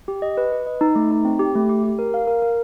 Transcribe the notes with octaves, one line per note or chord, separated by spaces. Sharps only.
G4
D#5
B4
B4
D#5
D#4
A3
D#4
C4
G4
A3
G4
G4
A#4
F5
A#4
A#4